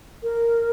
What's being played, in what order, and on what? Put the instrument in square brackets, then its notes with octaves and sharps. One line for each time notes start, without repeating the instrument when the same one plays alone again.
[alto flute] A#4